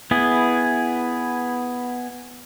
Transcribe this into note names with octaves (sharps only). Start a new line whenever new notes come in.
B3 E4 G#4